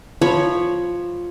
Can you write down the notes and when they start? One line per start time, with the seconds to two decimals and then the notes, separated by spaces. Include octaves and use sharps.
0.22 F3 C#5 B5